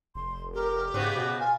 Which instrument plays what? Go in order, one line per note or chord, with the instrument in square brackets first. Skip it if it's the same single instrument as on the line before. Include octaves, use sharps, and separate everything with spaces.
[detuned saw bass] F1 [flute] C6
[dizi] G4 [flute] A#4
[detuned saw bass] G#2 [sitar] C#3 B3 C4 [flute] F#4
[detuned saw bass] B2 [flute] F#4
[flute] F4 [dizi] G#5